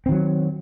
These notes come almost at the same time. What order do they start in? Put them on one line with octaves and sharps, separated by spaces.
C4 D#3 F#3